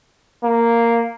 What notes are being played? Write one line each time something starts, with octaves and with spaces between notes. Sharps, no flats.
A#3